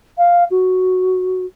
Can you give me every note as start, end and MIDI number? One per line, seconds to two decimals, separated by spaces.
0.18 0.44 77
0.51 1.45 66